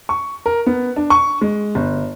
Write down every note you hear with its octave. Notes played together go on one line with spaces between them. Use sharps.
C#6
A#4
B3
D4
C#6
G#3
G1